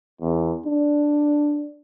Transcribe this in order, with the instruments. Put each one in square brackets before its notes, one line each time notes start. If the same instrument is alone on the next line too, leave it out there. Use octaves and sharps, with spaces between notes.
[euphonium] E2
D4